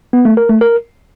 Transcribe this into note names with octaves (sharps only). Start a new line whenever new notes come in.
B3
A3
A#4
A3
A#4